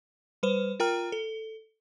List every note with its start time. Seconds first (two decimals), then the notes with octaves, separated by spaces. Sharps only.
0.43 G3 B4 C5
0.80 F4 A#4 G5 A#5 F6
1.12 A4